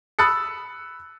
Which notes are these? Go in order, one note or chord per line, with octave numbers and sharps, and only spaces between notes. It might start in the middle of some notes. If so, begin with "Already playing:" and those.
B5 D#6 E6 F#6 A6 C#7